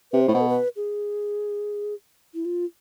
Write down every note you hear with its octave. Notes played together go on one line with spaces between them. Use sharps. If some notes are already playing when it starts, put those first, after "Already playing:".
C3 B4
C5
A2
B2
A4
B4
G#4
E4
F4